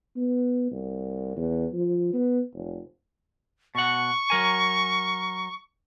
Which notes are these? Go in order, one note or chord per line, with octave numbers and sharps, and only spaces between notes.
B3
C2
E2
F3
B3
F1
B2 F#5 C#6
F#3 A#4 G#5